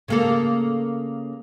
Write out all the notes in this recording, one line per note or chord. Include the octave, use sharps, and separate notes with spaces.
C#3 A#3 A4